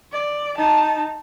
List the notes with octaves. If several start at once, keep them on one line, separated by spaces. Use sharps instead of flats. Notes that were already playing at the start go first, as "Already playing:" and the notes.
D5
D#4 A5